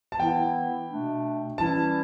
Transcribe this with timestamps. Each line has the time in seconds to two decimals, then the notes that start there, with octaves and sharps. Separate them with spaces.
0.12 A5
0.19 E3 B3 E4 G5
0.89 B2 A3 D4
1.58 E3 G3 C#4 E4 A5